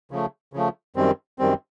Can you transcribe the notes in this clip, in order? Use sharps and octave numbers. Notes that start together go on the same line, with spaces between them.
C#3 F3 A3
C#3 F3 A3
F#2 D#3 G3 C4
F#2 D#3 G3 C4